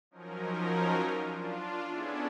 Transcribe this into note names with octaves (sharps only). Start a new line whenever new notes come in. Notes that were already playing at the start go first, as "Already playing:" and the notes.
F3 F#3 C#4 D#4 A#4
D4 F4
B3 C#4 D4 E4 G#4 A4